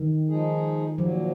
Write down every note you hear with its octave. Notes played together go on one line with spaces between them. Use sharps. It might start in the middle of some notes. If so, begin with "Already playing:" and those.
Already playing: D#3
F3 G#3 D#4 G#4
A#2 F3 F#3 A#3